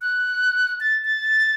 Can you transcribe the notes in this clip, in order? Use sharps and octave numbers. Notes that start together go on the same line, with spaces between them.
F#6
A6
A6